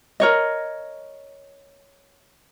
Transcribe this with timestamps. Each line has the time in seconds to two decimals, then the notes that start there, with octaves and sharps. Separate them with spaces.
0.20 A#4 C#5 D#5